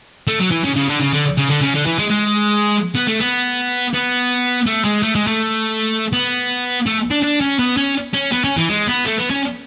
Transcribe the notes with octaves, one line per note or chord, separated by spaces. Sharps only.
A3
F#3
E3
C#3
C#3
D3
C#3
D3
C#3
D3
C#3
D3
E3
G#3
G#3
B3
A3
B3
B3
A3
G#3
A3
G#3
A3
B3
A3
D4
D4
C#4
B3
C#4
C#4
B3
C#4
E3
G#3
B3
A3
B3
C#4